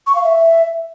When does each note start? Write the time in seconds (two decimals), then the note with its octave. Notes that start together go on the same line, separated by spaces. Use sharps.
0.07 C#6
0.15 F5
0.24 E5